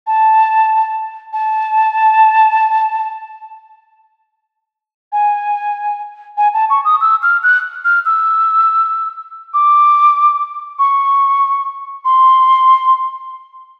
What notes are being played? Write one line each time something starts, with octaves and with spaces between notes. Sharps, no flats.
A5
A5
G#5
G#5
A5
C#6
D#6
E6
F6
F#6
F6
E6
D6
C#6
C6